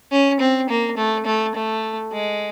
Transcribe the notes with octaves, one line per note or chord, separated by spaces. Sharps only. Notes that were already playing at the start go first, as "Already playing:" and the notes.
C#4
C4
A#3
A3
A3
A3
G#3